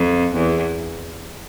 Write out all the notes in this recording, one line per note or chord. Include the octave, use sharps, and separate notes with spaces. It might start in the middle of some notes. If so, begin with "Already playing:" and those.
Already playing: F2
E2